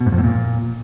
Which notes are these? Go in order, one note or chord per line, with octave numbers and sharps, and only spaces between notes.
B2
G#2
F2
A2
A#2